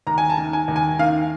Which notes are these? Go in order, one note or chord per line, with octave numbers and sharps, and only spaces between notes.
D#2 A#5
G#5
A5
D#3
G#5
D#2
G#5
D#3 F5